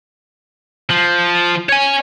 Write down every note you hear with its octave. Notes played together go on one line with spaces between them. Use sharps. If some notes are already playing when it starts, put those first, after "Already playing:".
F3
C#5 G#5